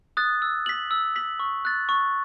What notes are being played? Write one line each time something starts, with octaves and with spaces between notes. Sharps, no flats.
D#6 F#6 A6
E6
B6 F#7
E6
B6 F#7
C#6
F#6 A6
C#6